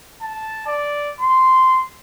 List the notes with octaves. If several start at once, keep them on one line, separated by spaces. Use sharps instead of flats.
A5
D5
C6